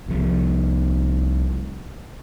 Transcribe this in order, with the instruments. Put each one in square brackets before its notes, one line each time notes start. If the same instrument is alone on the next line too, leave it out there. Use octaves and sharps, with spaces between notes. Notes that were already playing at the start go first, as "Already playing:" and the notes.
[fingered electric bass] C2 F3